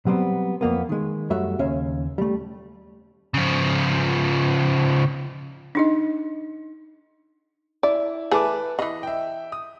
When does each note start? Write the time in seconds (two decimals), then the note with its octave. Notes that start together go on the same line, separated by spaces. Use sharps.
0.07 F#3 G3 B3 C4
0.61 F2 A#3 B3
0.89 D#3 G#3
1.30 F#2 G3 A3 F#4 E5
1.59 D#2 C#3 C#4 E5 F5
2.18 G3 A3
3.34 C#3 F3
5.75 D4 D#4 D#5
7.83 E4 D5
8.31 E3 A3 G#4 B4 A5 D6
8.79 C#3 E3 D#5
9.03 E5 G5
9.52 D#6